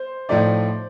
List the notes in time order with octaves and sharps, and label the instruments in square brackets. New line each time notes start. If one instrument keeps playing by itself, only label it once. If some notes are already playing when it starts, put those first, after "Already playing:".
Already playing: [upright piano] C5
[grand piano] A2 F3 A3 D#4 [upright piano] D5